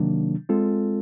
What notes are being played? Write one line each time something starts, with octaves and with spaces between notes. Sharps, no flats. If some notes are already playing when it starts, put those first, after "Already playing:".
Already playing: C3 D#3 F#3 A#3 D4
G#3 C4 F4 A4